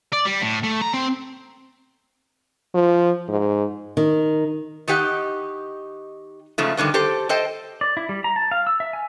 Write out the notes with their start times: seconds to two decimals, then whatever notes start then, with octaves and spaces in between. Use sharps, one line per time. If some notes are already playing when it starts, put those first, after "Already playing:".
0.13 D5
0.25 G3
0.42 A2
0.64 A3
0.81 A#5
0.94 C4
2.74 F3
3.28 G#2
3.97 D#3
4.88 D#3 D#4 G4 F#5
6.58 G#2 C#3 F3 A3
6.77 B2 D3 D#3 G3
6.94 G4 A4 C5
7.29 A4 C5 D#5 G5
7.81 D5
7.97 E4
8.09 G3
8.24 A#5
8.36 A5
8.51 F5
8.67 E6
8.80 E5
8.93 G#5